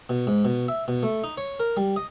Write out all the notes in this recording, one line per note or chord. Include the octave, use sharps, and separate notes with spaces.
B2
G#2
B2
E5
B2
A3
D#4
C#5
A#4
G3
D#5